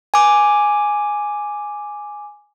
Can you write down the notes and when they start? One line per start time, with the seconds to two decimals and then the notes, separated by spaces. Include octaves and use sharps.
0.14 G#5 D6